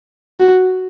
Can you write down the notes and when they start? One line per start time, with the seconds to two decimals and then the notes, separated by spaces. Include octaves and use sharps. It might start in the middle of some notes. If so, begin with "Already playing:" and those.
0.40 F#4